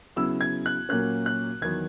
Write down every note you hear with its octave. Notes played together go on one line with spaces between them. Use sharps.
C#3 F#3 B3 E4 E6
G#6
F#6
A#2 F#3 A#3 C#4 F#6
F#6
E2 D#3 F#3 B3 G#6